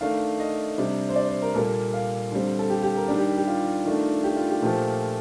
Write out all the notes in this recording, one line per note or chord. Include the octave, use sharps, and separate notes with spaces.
D#3 A3 D4 F5
D#5
C3 G3 D4
C5
D5
C5
A#4
A#2 G3 A#3 A4
F5
D3 G3 C4
A4
G4
G4
A#4
D#3 G3 D4
G4
G4
F4
D#3 A3 D4
G4
F4
G4
A#2 F3 A3 G4